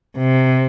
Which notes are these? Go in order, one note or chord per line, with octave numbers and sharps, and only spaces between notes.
C3